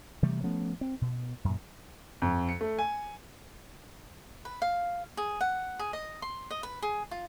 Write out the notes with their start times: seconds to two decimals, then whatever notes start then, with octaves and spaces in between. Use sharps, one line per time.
0.22 C3 E3 G3 A3
0.43 F3 A3 B3 C#4
0.81 C4
1.02 B2
1.44 F#2 A#2
2.22 F2
2.49 C#7
2.61 A3
2.78 G#5
4.45 B4
4.62 F5
5.17 G#4
5.41 F#5
5.79 G#4
5.93 D#5
6.22 C6
6.51 D#5
6.63 B4
6.82 G#4
7.11 F4